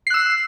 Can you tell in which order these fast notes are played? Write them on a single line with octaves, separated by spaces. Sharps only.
C7 F#6 E6